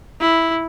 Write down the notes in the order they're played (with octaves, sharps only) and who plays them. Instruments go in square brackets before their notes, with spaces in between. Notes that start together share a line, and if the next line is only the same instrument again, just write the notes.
[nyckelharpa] E4